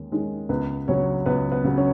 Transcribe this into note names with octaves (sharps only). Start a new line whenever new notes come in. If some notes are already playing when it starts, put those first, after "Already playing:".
Already playing: D#2 G#3 C#4
D#3 G#3 C#4
C#2 B3 B4
C#3 F#3 B3 C#4 C#5
C#2 B3 B4
B3 B4
C#3 F#3 B3
C#4 C#5